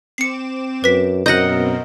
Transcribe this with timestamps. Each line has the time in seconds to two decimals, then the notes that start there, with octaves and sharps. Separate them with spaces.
0.18 C4 D6 C7 C#7 E7
0.84 F#2 B4 B6
1.26 F#2 B2 C4 A#4 D#5 F#5 G6 A#6